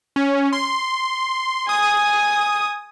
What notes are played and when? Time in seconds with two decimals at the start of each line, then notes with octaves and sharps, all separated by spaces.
0.16 C#4
0.53 C6
1.69 G#5 D#6